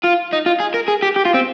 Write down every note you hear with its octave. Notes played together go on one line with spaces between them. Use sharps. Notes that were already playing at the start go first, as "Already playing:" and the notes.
F4
D#4
F4
G#4
A#4
G#4
G4
G4
F4
C4